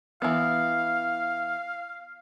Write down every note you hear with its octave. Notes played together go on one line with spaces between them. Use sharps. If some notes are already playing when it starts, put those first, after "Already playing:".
E3 B3 F5